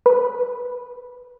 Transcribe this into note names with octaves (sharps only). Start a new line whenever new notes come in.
B4